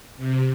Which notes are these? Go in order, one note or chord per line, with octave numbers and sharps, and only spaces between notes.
C3